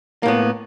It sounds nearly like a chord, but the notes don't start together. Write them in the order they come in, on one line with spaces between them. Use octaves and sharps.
A#3 A2 B3